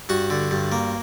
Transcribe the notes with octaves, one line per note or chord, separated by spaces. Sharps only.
G2 F#4
D3
G2
A#3